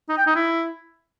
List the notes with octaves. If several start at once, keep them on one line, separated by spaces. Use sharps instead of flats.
D#4
G5
D#4
E4